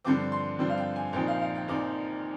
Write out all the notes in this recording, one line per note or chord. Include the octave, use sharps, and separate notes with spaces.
G2 D3 F3 C4 D6
C6
G2 D3 F3 C4
F5
G5
G#5
A#1 A#2 F3 C4 D#4 G5
F5
F5
G5
A#1 A#2 F3 C4 D#4 D6